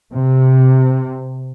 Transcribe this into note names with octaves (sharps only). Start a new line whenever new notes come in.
C3